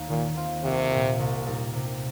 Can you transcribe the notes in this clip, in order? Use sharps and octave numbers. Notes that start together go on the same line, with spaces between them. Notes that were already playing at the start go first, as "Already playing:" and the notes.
Already playing: D#2 A#3
A#2 D#3
C4 F4
C2 C3
A#2 A#3
C2
A#2 G3 D#4
C3